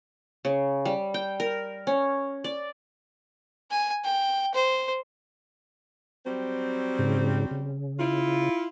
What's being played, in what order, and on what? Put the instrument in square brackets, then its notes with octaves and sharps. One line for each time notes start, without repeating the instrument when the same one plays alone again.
[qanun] C#3
G3
G5
A#4
C#4
D5
[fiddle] G#5
G5
C5
[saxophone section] F#3 G3 C4
[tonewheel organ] G#2 C#3
C#3
[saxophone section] E4 F4